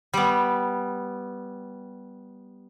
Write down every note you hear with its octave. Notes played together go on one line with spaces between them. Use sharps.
G3 B3